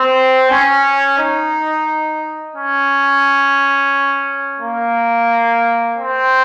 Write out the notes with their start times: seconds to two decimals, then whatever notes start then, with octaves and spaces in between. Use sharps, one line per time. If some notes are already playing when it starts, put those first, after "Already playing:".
Already playing: C4
0.50 C#4
1.18 D#4
2.55 C#4
4.60 A#3
5.96 C4